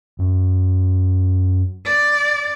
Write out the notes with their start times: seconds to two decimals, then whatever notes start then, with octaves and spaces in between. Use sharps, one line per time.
0.19 F#2
1.85 D5